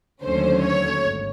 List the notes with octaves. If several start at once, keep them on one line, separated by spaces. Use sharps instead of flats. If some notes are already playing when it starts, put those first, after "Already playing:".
D#2 D3 F#3 A3 C#4 C5
C#5
G#1